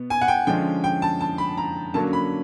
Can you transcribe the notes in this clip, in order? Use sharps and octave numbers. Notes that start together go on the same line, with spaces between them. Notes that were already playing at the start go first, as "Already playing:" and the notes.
Already playing: B2 B3
G#5
F#5
G5
D3 F3 G#3 C#4 G5
G5
A5
A5
B5
A#5
D3 F#3 A#3 C#4 A5
B5